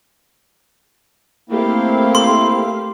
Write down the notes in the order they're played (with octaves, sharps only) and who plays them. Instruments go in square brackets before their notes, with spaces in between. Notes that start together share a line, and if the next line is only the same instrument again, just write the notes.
[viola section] A3 G4 F5 [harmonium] A#3 C4 E4
[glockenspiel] C6